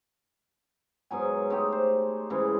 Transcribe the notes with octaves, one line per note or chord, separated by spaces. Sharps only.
G#2 B2 F#3 G#5
G#3 A3 D#4 G4
C5
G#2 C#3 E3